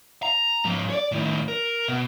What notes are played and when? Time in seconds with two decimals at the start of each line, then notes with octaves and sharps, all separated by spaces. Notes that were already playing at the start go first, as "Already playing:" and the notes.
0.23 A#5
0.65 G#2 F3
0.90 C#5 D5
1.12 A2 D#3
1.48 A#4
1.88 B2